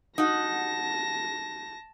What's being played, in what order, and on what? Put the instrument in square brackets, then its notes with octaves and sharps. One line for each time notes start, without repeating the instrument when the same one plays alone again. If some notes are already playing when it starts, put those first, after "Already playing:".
[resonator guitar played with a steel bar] D#4 F#4 [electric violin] A5 A#6